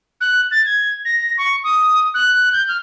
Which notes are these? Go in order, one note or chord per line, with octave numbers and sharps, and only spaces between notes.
F#6
A6
G#6
A#6
C#6
D#6
F#6
G6
F6